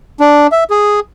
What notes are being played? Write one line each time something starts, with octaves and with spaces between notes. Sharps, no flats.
D4
E5
G#4